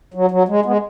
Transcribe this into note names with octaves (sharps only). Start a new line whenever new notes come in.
F#3
F#3
G#3
G#3 B3